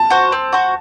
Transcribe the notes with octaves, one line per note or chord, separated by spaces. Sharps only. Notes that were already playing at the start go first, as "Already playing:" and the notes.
Already playing: A5
F#4 C5
C4
F#4 C5